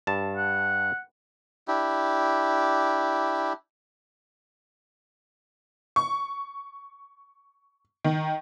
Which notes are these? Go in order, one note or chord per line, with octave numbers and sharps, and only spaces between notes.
G2 A5
F#5
D4 E4 G4
C#6
D#3